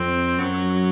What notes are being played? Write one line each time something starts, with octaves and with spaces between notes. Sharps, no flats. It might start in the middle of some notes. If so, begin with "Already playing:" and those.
Already playing: F2 C4
F#2 F#3